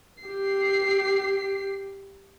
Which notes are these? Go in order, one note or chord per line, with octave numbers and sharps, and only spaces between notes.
G4 C7